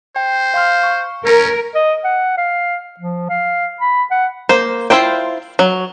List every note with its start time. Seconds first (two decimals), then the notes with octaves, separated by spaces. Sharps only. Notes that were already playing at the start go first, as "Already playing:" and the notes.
0.16 C5 G5
0.54 F5 C6 F6
0.83 C#6
1.25 C#4 A#4
1.75 D#5
2.04 F#5
2.37 F5
2.99 F3
3.29 F5
3.80 B5
4.11 F#5
4.49 A#3 C5
4.90 E4 F4 C5 G5
5.59 F#3